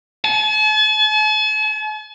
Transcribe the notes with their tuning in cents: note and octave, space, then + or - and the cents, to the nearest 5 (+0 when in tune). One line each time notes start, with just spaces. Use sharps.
A5 -45